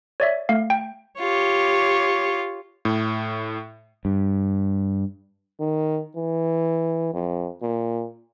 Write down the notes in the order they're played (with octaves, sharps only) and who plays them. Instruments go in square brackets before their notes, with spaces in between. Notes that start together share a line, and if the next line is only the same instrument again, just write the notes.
[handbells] C#5 D5 E5
A3 F5
G5
[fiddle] F4 [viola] G4 C#5
[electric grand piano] A2
[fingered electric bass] G2
[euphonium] D#3
E3
F2
A#2